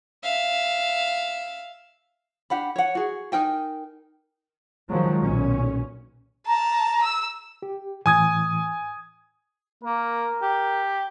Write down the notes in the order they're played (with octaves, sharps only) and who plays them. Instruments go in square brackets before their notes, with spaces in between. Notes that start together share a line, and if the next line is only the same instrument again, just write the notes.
[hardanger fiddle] E5 F5
[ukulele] D4 G4 F#5 B5
C#5 F#5
F#4 G#4
D#4 A#4 G5 G#5
[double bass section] D#3 F3 F#3 G#3
B1 A#2 C#4
[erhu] A5 [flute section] A#5
[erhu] E6
[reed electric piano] G4
[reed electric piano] A2 E3 [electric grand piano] G#5 D#6 G#6
[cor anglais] A#3 [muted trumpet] A#4
[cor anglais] G4